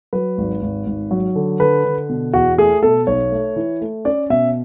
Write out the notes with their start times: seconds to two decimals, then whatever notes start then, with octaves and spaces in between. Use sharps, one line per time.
0.13 F#3 B4
0.38 G#1
0.62 G#1
0.86 G#1
1.11 F#3
1.35 D3
1.60 D3 B4
1.85 D3
2.09 B2
2.34 E2 F#4
2.58 A3 G#4
2.83 B2 A4
3.07 B1 C#5
3.32 A3
3.56 E3
3.81 A3
4.05 C#4 D5
4.30 B2 E5